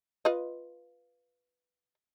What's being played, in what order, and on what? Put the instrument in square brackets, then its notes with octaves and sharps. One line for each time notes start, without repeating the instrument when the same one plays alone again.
[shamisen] F4 B4 D#5